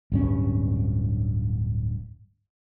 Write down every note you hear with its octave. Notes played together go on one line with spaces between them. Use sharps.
D1 G2 C#4